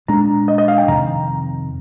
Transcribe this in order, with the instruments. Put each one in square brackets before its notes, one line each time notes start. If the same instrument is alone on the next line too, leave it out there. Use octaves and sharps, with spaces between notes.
[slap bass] A#2 G#3 D4 [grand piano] A#5
[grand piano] D#5
D#5
F5
G5
[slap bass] F2 C3 D#3 [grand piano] A#5